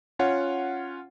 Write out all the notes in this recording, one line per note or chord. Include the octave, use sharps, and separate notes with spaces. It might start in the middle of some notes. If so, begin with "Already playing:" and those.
C#4 F4 C#5 F#5